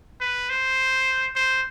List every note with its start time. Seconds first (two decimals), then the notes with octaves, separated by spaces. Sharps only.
0.21 B4
0.50 C5
1.36 C5